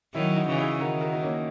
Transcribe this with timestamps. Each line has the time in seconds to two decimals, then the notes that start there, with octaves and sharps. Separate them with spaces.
0.14 D#3 F#3 C#4 E4
0.36 D#4 F#4
0.47 C#3 E3
0.58 E4 G#4
0.79 D#3 F#4 A#4
1.01 F#4 A#4
1.13 D#4
1.23 A#3 C#4